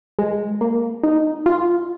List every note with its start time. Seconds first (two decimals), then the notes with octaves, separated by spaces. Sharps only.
0.19 G#3
0.61 A#3
1.03 D#4
1.46 F4